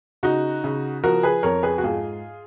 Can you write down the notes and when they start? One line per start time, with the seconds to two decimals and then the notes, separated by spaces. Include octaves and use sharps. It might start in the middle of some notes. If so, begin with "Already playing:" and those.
0.23 C#3 D#4 F#4
0.64 C#3
1.04 F3 F#4 A#4
1.23 G#4 B4
1.43 F2 A#4 C#5
1.63 G#4 B4
1.78 F#4
1.84 G#2 F4 G#4